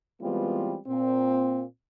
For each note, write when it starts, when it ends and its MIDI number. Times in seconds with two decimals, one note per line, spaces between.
0.21 0.77 52
0.21 0.77 55
0.21 0.77 56
0.21 0.77 59
0.21 0.77 60
0.21 0.77 65
0.87 1.64 46
0.87 1.64 60